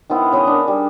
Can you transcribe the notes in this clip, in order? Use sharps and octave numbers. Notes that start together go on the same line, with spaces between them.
D#3 F3 B3 E4
C#3 B3 D#5 G#5
D4 A#4
G3